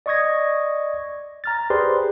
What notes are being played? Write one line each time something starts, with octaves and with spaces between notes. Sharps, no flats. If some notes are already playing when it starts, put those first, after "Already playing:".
D5 D#5 C#6 D#6 G#6 A#6
A#5 F6 A6
G4 G#4 B4 C5 D5 C6